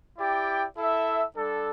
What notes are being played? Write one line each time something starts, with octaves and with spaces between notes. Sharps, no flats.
E4 G4 D5 G5
E4 A4 E5
G3 D4 A4